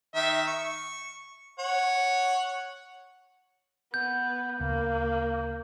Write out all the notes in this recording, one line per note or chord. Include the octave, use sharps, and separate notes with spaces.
D#3 E5
C#6
C#5 F#5
B3 G6
D2 C#3 A#3